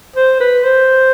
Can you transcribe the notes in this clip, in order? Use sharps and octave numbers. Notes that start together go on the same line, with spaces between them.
C5
B4
C5